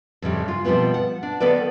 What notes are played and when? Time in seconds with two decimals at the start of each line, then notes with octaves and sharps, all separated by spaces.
0.22 F2 A2 C#3 G3
0.48 F#2 F4
0.65 B2 F3 G3 A3 B3 C4
0.94 F#5
1.23 D4
1.40 D#3 B3 A4 B4 D5